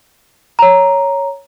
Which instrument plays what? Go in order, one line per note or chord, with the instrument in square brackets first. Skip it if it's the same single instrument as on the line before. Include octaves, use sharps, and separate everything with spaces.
[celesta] C#5 A#5